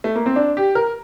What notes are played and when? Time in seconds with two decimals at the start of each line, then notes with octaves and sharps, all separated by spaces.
0.04 A3
0.16 A#3
0.26 C4
0.36 D4
0.57 G4
0.75 A#4